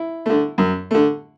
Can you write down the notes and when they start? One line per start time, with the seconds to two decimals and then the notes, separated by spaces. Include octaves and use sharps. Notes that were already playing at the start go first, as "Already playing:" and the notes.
Already playing: E4
0.26 D3 A3
0.58 F#2
0.91 D3 A3